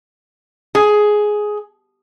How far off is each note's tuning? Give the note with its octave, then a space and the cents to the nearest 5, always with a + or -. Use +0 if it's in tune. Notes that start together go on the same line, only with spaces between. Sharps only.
G#4 +10